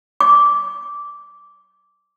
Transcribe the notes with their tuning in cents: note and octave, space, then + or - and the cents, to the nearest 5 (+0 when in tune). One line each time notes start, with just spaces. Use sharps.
D6 -10